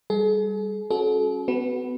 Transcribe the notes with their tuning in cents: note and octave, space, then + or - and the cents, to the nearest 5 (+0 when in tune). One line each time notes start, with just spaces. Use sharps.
G3 +10 G#4 +45
C#4 -20 F#4 -15 A4 -40
B3 +35 F#4 +10 B4 +0